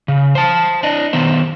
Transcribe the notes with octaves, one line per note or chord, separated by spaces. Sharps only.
C#3
C5 A5
D4 D#5
D#3 B3 C5